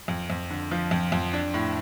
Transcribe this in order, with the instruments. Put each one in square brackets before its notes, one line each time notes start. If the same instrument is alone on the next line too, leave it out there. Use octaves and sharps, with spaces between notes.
[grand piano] F2
F2
D3
F3
F2
F2
D4
A2